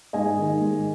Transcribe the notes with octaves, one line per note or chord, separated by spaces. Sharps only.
G#2 D#5 G#5
D#3
G#2